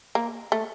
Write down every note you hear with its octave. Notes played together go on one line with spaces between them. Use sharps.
A#3
A3